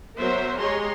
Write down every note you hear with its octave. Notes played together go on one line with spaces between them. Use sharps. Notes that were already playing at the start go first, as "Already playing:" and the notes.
F#3 B3 A#4 C5 E5
G#3 G4 G#4 C#5 A#5 C6